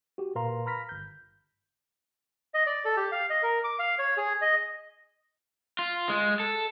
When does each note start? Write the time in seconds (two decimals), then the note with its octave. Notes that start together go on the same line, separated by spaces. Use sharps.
0.18 F#4 G4
0.35 A#2 A#4 B4 F5 A#5 C6
0.66 A#5 B5 F6 A#6 B6
0.89 G1 G6
2.54 D#5
2.66 D5
2.85 A4
2.96 G4
3.12 F5
3.30 D#5
3.43 A#4
3.64 D6
3.79 F5
3.99 C#5
4.17 G#4
4.42 D#5
5.79 F4
6.09 G#3
6.40 A4